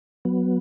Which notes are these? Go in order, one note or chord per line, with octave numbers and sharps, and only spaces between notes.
F#3 B3